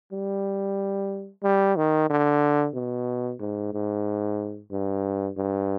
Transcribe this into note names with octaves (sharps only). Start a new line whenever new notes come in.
G3
G3
D#3
D3
B2
G#2
G#2
G2
G2